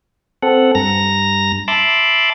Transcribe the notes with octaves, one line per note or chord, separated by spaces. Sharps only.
C4 A4 F#5
G2 A#5 A#6
E5 A5 B5 C6 D6